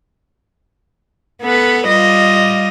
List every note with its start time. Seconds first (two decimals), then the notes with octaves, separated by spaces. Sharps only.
1.42 B3 A4 B4
1.87 G3 F4 D#5